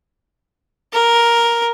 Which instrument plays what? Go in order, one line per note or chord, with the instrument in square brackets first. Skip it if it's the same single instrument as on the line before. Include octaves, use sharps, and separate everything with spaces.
[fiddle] A#4